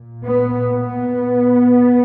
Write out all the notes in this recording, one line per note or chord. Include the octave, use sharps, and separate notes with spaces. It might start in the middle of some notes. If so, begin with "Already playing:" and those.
Already playing: A#2
B3
B3